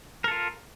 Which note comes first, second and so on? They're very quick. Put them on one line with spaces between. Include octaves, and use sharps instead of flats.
A#4 A4 F4